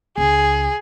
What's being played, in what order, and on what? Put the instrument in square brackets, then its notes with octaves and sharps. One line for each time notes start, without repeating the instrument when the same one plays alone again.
[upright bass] C#2 [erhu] G#4